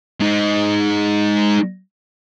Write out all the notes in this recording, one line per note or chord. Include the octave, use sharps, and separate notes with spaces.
G#3 D#4